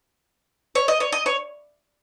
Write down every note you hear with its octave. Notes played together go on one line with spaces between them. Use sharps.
C#5
D#5
C#5
D#5
C#5